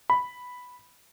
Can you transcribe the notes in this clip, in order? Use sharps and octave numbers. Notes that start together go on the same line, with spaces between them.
B5